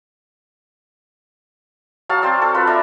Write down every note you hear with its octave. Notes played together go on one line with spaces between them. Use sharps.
F#3 F5 A5
C4 D5 E6
A4
F4 B4 B5
D4 D5 E5 A#5